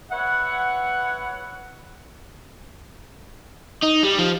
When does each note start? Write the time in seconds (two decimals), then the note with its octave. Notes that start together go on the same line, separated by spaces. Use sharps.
0.11 B4 C#5 E5 F#5
3.83 D#4
4.03 G3
4.18 F3